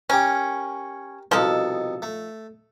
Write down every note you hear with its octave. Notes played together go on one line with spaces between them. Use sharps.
C#4 G4 A#4
C2 B2 F3 D#4 A4
A3